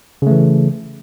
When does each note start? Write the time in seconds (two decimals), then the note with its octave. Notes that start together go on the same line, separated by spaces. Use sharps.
0.22 C#3
0.27 A3
0.31 E3